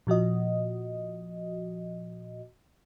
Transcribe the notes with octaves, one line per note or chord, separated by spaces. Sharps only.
A#2 F3 F#4 D#5